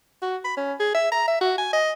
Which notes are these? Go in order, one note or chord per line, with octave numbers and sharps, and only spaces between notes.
F#4
B5
C#4
G#4
E5
A#5
E5
F#4
G#5
D#5